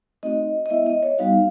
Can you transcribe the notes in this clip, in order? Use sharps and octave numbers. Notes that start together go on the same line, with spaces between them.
A3 C4 D#4 F#4 D#5
D#5
G#3 B3 E4 E5
D#5
C#5
G3 B3 D#4 F#4 F5